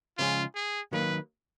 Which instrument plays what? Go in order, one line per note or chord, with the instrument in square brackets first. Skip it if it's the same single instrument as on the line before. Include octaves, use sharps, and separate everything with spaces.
[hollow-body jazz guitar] C#3 F3 G#3 C#4 G#4 [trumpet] F4
[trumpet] G#4
[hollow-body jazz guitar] D#3 F#3 A#3 [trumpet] B4